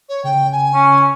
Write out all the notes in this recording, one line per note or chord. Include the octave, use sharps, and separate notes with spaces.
C#5
C#3 G5
G#5
C#4